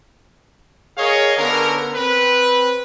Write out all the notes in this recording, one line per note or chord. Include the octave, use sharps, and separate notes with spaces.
G#4 A#4 C#5 D#5 F5
D3 B3 C#4 A#4
C4 B4